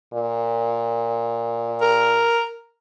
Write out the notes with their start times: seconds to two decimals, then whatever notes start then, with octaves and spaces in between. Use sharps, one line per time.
0.13 A#2
1.81 A#4